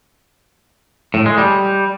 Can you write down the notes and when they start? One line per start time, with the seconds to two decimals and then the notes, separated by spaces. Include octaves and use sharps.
1.14 A2
1.26 G#3
1.38 G3